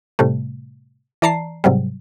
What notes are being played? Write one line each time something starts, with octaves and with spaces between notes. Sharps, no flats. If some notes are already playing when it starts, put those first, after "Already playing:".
A2 C3 G3 A3
E3 D5 A5 A#5 C7
G#2 C3 F#3 G3